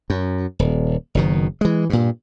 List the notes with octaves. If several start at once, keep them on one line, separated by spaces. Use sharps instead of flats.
F#2
D#1
F#1 B2 D#3
E3 G#3
G2 A#2